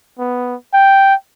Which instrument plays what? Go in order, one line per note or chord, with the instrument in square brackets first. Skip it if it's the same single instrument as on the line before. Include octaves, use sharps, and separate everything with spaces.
[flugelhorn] B3
G5